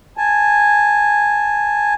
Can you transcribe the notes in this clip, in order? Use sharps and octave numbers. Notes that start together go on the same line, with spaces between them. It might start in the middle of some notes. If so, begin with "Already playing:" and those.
G#5 A5